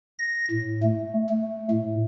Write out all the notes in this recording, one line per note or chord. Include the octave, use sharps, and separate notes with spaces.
A#6
A2
A3
A3
A2